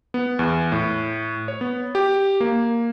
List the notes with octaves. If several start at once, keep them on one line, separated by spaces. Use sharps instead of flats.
B3
E2
A2
C#5
B3
G4
A#3